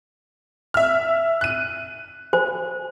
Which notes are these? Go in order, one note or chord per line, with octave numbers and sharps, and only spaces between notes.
E5 F6
F#6 D#7
C5